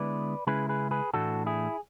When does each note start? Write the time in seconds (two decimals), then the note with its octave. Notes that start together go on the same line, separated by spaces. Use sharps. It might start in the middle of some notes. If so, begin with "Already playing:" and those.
Already playing: D3 G#3 B3 E4 B4 D5
0.47 C#3 G#3 C#4 E4 G#4 B4
0.69 G#4 B4
0.91 G#4 B4
1.13 A2 E3 A3 D4 F#4 A4
1.46 E4 G#4